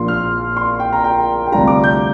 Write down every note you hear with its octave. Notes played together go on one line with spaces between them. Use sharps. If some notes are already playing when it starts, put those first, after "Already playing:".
Already playing: A#1 A#2 F3 A#3 F4 C6
F6
C6
G5
A#5
G5
G5
D2 C3 G3 D4 F4 A#5
D6
G6